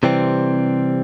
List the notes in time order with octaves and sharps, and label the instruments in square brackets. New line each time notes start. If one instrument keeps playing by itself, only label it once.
[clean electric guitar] C3 E3 G3 C4